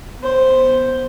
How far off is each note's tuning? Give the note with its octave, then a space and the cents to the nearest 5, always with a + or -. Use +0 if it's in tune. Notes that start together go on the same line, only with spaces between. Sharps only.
B3 +0 C5 +0